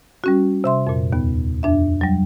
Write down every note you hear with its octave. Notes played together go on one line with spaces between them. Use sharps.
G3 C#4 F#4
C3 E5 C6
F2 A#2
D#2 B3
F2 D4 E5
F#3 G3